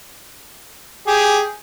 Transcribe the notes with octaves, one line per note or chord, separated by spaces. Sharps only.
G4 G#4